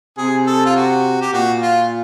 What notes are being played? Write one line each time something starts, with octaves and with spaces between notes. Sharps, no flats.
C3 G#4
A4
F4
F#4
G4
A#2 F#4
F4